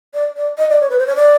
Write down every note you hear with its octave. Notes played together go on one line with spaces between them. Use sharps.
D5
D5
D#5
D5
C#5
B4
C5
C#5
D5